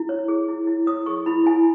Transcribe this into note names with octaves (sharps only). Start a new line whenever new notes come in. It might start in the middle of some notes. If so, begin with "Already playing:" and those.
Already playing: E4
C#5
G#4
E4
E4
C#5 D#6
G#4 C#6
E4 B5
E4 G#5